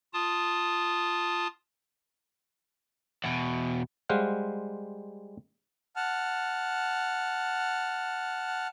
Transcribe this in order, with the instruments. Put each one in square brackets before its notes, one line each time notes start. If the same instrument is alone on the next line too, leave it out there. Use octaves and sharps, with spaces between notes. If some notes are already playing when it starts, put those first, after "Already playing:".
[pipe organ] F4 A5 D#6
[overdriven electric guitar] E2 B2
[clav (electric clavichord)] G3 G#3 C5 F5 F#5
[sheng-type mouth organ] F#5 A5 F6